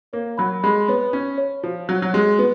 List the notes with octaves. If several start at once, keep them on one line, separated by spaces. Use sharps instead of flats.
A#3 C#5
F#3 B5
G#3 B5
B3 C#5
C#4 C#5
C#5
F3 F#4
F#3 F#4
F#3
G#3 F#4
B3 F#4